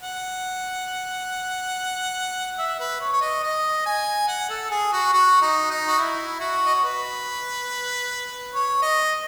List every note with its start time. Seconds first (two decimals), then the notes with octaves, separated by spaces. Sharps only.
0.03 F#5
2.58 E5
2.80 B4
3.01 C#5
3.13 C#5
3.21 D#5
3.44 D#5
3.86 G#5
4.28 F#5
4.49 A4
4.71 G#4
4.92 F#4
5.13 F#4
5.42 D#4
5.70 D#4
5.88 F#4
5.98 E4
6.40 F#4
6.66 D#5
6.74 C#5
6.83 B4
8.54 C#5
8.82 D#5